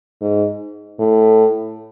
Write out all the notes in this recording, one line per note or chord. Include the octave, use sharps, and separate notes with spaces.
G#2
A2